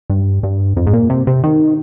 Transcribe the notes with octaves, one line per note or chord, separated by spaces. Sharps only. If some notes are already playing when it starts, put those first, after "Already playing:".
G2
G2
F2
G#2
A#2
C3
C3
D#3